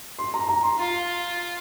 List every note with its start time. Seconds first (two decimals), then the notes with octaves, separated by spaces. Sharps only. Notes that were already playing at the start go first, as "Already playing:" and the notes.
0.19 C6
0.34 A#5
0.49 A#5
0.63 C6
0.78 F4